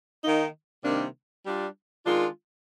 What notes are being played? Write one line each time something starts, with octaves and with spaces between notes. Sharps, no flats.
D#3 A#3 D#4
C3 D#3 G3 A#3 D4
G3 D4 F4
D#3 G#3 D4 F4